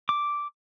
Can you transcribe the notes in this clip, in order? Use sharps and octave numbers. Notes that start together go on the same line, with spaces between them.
D6